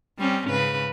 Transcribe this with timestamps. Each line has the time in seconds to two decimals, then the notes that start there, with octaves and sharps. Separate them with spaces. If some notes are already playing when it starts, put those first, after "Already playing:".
0.19 G3 C4 C#4
0.49 G#2 C#3 B4